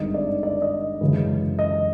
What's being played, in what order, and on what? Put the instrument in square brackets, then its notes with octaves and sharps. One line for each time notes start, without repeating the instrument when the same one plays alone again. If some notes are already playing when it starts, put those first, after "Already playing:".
Already playing: [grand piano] G#1 G2 D#3 G#3 D#5
D5
D5
D#5
F#2 C#3 E3 G#3
D#5